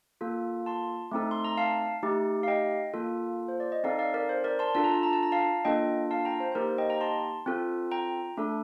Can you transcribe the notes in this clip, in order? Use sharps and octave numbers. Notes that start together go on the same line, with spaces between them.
A#3 F4 A4
A5 C6
A3 C4 D#4 A4
C6
A#5
F5 A5
A3 D#4 G4
F5
D#5 G5
A#3 F4 A4
C5
D5
D#5
C4 D#4 A4 D5 F5
D5 F5
A#4 D5
C5
A#4 D5
A5 C6
D4 F4 A4 A5
A#5
A5
A#5
A5
A#5
F5 A5
A#3 D4 F4 A4 D#5 G5
F5 A5
G5 A#5
C5
C5
A#3 D#4 G4 A#4
C5
D#5 G5
G5 A#5
A5 C6
C4 F4 A4
G5 A#5
A3 D4 A4